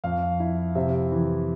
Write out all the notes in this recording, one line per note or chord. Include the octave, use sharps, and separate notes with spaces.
F2 F5
E4
C3 E5
E3